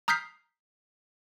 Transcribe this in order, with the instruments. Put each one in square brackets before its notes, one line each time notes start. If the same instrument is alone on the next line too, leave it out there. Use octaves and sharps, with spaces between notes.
[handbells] A#5 D#6 F6 G6 B6 C7